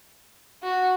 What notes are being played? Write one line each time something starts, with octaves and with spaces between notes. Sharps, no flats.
F#4